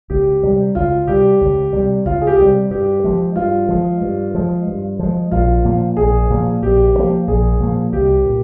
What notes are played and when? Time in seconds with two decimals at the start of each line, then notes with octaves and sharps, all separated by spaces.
0.10 C#2 G4
0.43 C3 G3
0.75 C#2 F4
1.07 C3 G3 G4
1.41 C#2
1.73 C3 G3
2.05 C#2 F4
2.21 G#4
2.27 G4
2.38 C3 G3
2.71 G2 G4
3.04 F3 G#3
3.36 G2 F4
3.69 F3 G#3
4.01 G2
4.35 F3 G#3
4.67 G2
4.99 F3 G#3
5.31 A#1 F4
5.65 A#2 F3 A#3
5.97 A#1 G#4
6.30 A#2 F3 A#3
6.62 A#1 G4
6.95 A#2
6.98 F3 A#3
7.27 A#1 G#4
7.60 A#2 F3 A#3
7.92 C2 G4
8.26 A#2